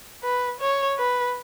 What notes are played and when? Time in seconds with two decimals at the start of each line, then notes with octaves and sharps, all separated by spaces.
0.23 B4
0.60 C#5
0.98 B4